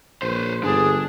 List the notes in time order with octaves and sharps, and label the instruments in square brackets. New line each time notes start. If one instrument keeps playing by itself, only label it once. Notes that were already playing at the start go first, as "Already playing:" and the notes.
[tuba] A#1 [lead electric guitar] B4 C5
[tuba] G1 [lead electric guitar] D4 [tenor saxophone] G#4